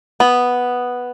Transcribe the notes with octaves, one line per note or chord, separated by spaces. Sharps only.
B3